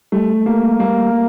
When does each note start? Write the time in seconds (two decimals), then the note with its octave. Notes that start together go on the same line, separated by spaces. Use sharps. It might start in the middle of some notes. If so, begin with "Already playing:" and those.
0.12 G3 A3
0.46 A#3
0.79 G3 A#3